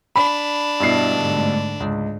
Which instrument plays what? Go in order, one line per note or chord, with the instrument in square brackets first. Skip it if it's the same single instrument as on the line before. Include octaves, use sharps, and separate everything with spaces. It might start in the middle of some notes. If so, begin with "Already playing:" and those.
[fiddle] D4 [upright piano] B5
[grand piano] G2 B2 C7 [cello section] E4
[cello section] G#2 D3 A3
[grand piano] C#2 [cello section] G#2